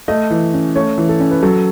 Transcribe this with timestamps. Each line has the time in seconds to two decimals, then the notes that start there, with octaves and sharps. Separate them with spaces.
0.08 A3 D#5
0.31 E3
0.54 C#4
0.76 A3 C#5
0.98 E3
1.09 A4
1.20 C#4
1.31 B4
1.43 F#3 A4